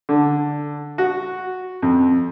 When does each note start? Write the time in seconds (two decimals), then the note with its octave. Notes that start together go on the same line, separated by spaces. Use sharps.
0.09 D3
0.98 F#4
1.82 F2